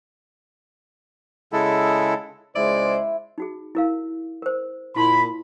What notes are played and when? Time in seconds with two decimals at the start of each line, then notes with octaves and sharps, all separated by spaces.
1.53 C#3 G#3 E4 A4
2.56 C#2 G#3 E4 C5 D5
3.38 D#4 F#4 G#4
3.75 E4 A#4 F5
4.42 A#4 C5
4.96 A#2 E4 A5 B5 C6